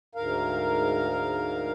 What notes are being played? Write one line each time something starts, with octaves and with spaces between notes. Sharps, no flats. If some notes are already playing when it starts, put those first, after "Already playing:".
D2 G#2 A#4 F5